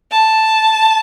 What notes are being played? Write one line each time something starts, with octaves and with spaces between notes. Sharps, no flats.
A5